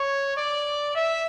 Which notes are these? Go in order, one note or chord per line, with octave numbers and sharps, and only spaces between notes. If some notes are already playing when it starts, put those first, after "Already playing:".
Already playing: C#5
D5
E5